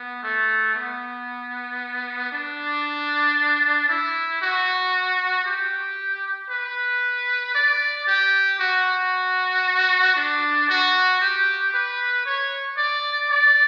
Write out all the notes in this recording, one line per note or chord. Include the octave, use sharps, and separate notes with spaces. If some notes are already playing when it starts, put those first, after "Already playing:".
Already playing: B3
A3
B3
D4
E4
F#4
G4
B4
D5
G4
F#4
D4
F#4
G4
B4
C#5
D5
D5